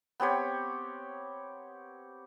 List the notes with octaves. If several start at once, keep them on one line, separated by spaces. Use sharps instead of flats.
B3 C4 G4 C#5